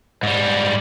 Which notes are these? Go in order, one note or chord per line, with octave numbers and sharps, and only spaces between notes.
G#2 G3